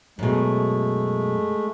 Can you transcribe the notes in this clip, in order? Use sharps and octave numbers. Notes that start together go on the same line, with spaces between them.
F#2 B2 G#3 A3